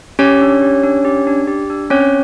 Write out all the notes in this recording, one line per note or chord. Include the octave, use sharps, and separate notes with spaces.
C#4 G4 C#5
D4
G4
D4
G4
D4
G4
D4
C4 C#4 C#5